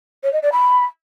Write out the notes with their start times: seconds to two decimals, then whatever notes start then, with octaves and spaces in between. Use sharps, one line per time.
0.23 C#5
0.33 D#5
0.42 D5
0.52 B5